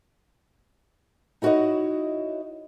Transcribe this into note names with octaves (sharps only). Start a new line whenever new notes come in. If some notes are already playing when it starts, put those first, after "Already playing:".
D#4 E4 F#4 B4 C#5 D#5